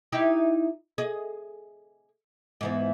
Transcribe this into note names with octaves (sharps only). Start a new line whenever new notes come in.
D#4 E4 G4
G#4 D#5
G#2 E3 B3